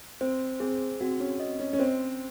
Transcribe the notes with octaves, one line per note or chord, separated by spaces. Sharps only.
C4 C5
C4 G#4
C4 F#4
C#4
D#5
C#4
C#4
C4 C5